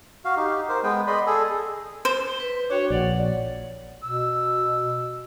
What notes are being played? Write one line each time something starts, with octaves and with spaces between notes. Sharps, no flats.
F#4 F5
D#4 G4
A#4 C5
G#3 B3 B4 G5
D5 D#5 B5 C6
G#4 A4
C5
B4
D4 F#4 C#5 G5
A#1 C#5 D5 F#5
B2 E6